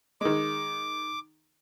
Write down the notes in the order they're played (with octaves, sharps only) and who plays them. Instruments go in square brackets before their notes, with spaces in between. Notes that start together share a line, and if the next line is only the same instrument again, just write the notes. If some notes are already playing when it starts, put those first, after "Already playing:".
[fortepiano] D#3 G#3 [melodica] D6